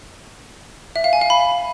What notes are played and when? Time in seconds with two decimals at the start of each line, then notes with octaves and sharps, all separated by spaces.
0.96 E5
1.04 F5
1.13 G#5
1.21 F5
1.30 B5